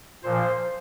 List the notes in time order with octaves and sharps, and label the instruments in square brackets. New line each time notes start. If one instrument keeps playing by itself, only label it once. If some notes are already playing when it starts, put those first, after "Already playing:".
[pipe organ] A#2 F3 C5